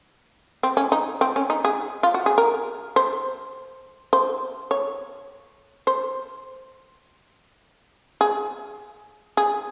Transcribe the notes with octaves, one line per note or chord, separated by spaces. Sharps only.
C4
C#4
D#4
C4
C#4
D#4
G#4
F4
F#4
G#4
A#4
C5
C5
C#5
C5
G#4
G#4